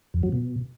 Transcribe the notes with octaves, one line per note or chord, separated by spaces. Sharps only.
F2
F#3
B2